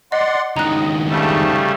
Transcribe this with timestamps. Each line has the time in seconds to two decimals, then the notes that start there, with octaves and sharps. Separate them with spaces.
0.12 D5 D#5 F#5 C6
0.57 C#2 D#3 D#5 A#5 F#6
1.10 G#2 C#3 G3 A3 A5